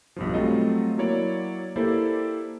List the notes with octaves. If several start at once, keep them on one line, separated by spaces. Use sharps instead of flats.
B1 G2 F3
F#3 G3 A3 C4 F4 D#5
F#3 A#3 E4 C#5 D5
A#3 E4 G4 A4 C5 D5